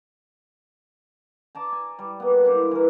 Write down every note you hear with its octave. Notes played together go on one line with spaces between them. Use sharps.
D5 A5 A#5
G#5
G3
A#3 B3
D4 E4 C5
E3 A#4